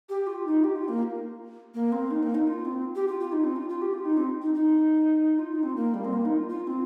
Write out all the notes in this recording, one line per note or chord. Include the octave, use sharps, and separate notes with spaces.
G4
F4
D#4
G4
F4
A#3
A#3
C4
D#4
A#3
D#4
F4
C4
G4
F4
F4
D#4
C4
F4
F4
G4
F4
D#4
C4
D#4
D#4
F4
D#4
C4
A#3
G3
C4
A#3
D#4
F4
F4
C4